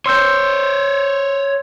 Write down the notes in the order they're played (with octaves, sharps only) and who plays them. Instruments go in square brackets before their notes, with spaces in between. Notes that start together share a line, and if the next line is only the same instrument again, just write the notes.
[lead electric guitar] C5 C#5 [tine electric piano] C6 E6 G6